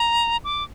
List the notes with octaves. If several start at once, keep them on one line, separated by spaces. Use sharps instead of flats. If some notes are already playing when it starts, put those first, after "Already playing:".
Already playing: A#5
D6